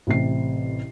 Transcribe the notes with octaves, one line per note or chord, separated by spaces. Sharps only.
A1 C3 C7